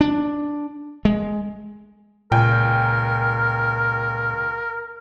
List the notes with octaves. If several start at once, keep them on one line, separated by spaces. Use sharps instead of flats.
D4
G#3
C#2 A#2 A#4 G5 G#5